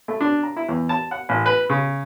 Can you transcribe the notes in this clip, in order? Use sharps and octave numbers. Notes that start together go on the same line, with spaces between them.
A3
D4
A#5
E4
E2
A5
F#5
A1
B4
C#3